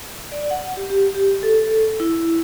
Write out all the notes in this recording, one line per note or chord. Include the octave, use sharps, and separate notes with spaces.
D5
F#5
G4
G4
G4
A4
E4